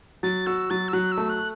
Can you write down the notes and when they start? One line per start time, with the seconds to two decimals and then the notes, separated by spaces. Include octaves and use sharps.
0.23 F#3 A6
0.46 F#4 E6
0.70 F#3 A6
0.88 E6
0.93 F#3 F#6
1.12 E6
1.17 A3
1.30 F#6